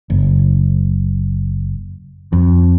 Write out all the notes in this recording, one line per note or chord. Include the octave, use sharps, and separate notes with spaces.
F#1
F2